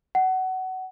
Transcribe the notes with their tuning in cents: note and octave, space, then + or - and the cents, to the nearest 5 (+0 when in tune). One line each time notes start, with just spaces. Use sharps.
F#5 +20